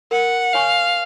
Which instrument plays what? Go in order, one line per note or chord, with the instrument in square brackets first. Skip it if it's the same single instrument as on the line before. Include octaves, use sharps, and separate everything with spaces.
[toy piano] A#4 [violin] F#5
[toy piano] C#5 G#5 C#6 [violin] F5